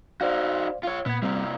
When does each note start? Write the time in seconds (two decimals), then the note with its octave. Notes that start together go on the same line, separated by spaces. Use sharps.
0.21 D#4 F#4 C5 D5 F5
0.83 F4 C#5
1.06 A#2 B3 G#6
1.22 C3 G3 A#3 C4